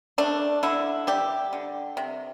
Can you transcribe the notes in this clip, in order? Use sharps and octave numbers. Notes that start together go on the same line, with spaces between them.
A3 D4
D3 E4
G3 G4
D3
C3